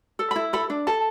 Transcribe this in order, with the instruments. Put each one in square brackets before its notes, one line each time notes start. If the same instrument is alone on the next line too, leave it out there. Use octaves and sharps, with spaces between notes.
[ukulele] A4
B5
E4
A4 B5
D4
A4 A5